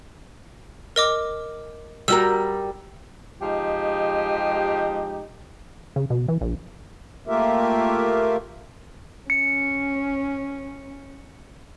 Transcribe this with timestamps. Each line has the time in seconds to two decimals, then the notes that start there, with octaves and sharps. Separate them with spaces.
0.96 A#4 D#5 D6
2.08 G3 F#4 A#4 E6
3.41 F3 G#3 D#4 G4
5.96 C#3
6.10 B2
6.28 E3
6.41 A#1
7.28 A3 A#3 F4 G4 A#4 E5
9.30 C#4 C#7